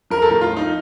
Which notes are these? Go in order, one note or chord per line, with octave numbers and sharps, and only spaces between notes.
F3 A#4
A4
A2 A#4
F4
F3
D#4